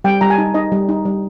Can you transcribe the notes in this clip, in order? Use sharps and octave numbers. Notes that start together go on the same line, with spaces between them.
G3 G5
G3 A#5
G#5
D#4 A5
D#4 D#5
G3
D#4
G3